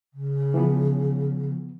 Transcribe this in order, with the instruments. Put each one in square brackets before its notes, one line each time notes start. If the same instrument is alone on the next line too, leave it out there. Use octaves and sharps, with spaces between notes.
[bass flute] C#3
[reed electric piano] E3 F3 B3